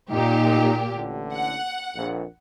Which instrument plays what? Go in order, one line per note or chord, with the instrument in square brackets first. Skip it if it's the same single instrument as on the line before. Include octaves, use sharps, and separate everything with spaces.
[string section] A#2 G4 [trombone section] D#4
[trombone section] A1 D3
[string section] F#5
[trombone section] A#1 F2